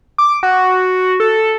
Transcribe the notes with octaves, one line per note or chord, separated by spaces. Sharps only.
D6
F#4
A4